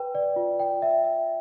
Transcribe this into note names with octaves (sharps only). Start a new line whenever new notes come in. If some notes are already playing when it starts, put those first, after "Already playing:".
Already playing: B4 G5
D5
F4
G5
E5
E5